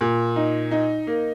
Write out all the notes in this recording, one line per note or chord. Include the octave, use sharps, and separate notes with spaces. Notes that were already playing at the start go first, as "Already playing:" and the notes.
A#2
D#4
D#4
A#3